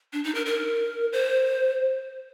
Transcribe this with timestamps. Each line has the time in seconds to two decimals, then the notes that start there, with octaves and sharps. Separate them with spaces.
0.13 D4
0.24 D#4
0.35 A#4
0.46 A#4
1.13 C5